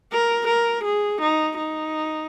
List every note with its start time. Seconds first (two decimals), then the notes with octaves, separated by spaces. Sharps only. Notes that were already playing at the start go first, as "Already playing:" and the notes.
0.12 A#4
0.48 A#4
0.85 G#4
1.22 D#4
1.57 D#4